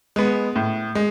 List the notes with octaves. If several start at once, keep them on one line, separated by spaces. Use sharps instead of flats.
G#3 B3
A2
G#3